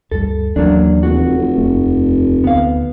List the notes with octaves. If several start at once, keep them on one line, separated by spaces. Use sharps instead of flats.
D2 G2 G3 A4
D#2 E3 F#3 A#3 C#4 D4
F1 F#4
F1
D#1 F2 A3
D2 B3 F5